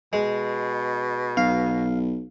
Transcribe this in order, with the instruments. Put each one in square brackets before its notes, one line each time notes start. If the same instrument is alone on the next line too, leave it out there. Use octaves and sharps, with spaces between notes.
[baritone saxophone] B2 [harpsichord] G#3
[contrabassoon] B1 [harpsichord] F5